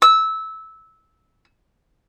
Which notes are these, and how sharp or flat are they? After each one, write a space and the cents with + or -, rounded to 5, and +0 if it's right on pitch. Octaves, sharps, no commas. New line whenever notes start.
E6 -15